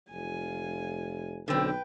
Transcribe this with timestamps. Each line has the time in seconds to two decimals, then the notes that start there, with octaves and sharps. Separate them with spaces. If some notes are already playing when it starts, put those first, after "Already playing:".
0.12 F1 F4 G#5
1.48 B1 D3 C4 B4 G5